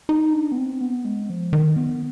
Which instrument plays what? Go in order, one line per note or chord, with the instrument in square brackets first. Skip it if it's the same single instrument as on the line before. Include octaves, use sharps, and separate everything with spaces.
[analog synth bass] D#4
D4
B3
C4
B3
G#3
F3
D#3
B3